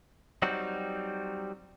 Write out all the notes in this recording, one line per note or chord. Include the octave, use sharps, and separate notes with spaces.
F#3 G3 C4 D#4 F#4